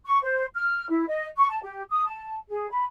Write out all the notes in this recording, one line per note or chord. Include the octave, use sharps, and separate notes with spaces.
C#6
C5
F6
E4
D#5
C#6
A5
G4
D#6
A5
G#4
B5